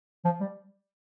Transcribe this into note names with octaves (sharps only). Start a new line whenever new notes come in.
F3
G3